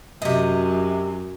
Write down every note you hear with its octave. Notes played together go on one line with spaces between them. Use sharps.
F#2 C3 F#3 D#5